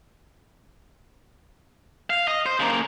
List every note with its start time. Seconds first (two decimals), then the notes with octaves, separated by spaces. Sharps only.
2.10 F5
2.28 D#5
2.46 C5
2.60 C#3 A#3